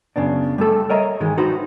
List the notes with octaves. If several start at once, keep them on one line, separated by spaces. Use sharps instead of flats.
F#2 C#3 B3 D4
G3 A3 A4
A#4 C#5 D#5 E5 A#5
G#2 D#3 E3 G#3
D#4 F#4 B4 C5